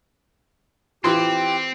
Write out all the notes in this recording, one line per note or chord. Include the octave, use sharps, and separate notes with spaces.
E3 C4 F4 G4 C6